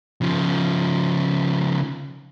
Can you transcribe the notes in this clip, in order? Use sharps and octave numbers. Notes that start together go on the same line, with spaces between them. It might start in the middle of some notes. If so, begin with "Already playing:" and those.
C#3 F3